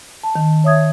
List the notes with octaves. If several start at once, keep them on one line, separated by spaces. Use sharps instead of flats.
A5
D#3
C#5 E5 D#6 G#6